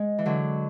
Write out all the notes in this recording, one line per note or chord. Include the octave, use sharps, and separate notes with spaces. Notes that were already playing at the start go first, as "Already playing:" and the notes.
Already playing: G#3
E3
D3 F#3